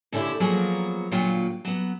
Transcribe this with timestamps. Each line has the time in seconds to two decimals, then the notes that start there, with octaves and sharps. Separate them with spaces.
0.12 A#2 D3 C#4 E4 G4
0.40 F3 F#3 A#3 B3 G#4 A#4
1.11 D2 A#2 F#3 A#3 F4 G5
1.65 F#3 B3